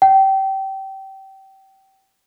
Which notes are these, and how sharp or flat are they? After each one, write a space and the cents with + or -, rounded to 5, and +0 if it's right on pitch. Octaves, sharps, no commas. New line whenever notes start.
G5 -25